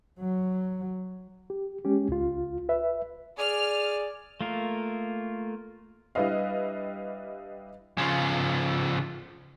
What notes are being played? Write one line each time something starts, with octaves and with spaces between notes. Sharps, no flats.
F#3
G4
G#3 C#4 G4
C#2 F4
B4 E5
G#4 D5 F6
A3 A#3 F4 A#4
G3 D4 E4 B4 D#5 F5
C#3 F3